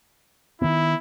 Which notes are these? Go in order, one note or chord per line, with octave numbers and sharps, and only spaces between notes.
D#3 B3 E4